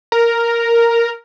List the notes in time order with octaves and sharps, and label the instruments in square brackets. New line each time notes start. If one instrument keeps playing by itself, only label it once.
[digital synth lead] A#4